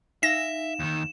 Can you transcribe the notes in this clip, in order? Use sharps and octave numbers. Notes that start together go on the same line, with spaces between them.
D#4 E5 F5 A#6 E7
D#2 D#3